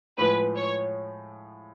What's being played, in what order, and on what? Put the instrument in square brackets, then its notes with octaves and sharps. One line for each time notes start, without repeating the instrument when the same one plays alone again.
[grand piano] A2 F3 G#3 [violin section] B4
[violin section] C#5